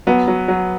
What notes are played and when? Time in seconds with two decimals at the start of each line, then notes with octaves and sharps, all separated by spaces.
0.07 F#3 B3
0.28 F#3
0.48 F#3